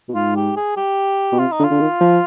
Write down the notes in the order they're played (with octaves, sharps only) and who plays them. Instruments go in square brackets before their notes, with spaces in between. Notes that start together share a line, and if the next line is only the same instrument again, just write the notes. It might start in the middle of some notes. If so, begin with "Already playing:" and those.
[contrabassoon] B2
[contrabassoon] G#2 [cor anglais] F4
[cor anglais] G4
G#4
G4
[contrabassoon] B2
[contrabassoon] C3 [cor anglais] F4
[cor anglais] D#4
[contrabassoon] D3
[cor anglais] F4
[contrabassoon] D3
D#3
F3